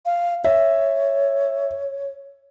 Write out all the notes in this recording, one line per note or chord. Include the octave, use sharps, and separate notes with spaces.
F5
C#5 E5